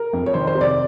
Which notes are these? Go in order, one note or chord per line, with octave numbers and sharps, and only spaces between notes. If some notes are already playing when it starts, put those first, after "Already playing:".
Already playing: A#4
F2
C#5
D#3 C5
C5
C3
D5